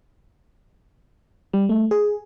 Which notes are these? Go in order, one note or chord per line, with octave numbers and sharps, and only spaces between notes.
G3
A3
G#4